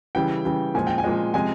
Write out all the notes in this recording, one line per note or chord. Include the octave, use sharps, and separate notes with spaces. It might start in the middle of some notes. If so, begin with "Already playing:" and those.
C#3 E3 G3 G5
C#3 E3 G3
A#2 F3 G#3 G#5
G5
G#5
A#2 F3 G#3
C3 F3 G#3 G#5